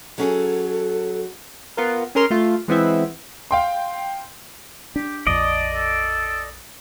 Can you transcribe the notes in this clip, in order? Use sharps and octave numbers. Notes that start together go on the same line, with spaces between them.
F#3 C#4 G#4 A4
B3 F4 A#4
C#4 G#4 A#4 C6 F6
A3 F4
E3 G#3 B3 C4 E4 E5
F5 G5 C6
D4 G4
A#1 F2 D5 D#5 A5
A4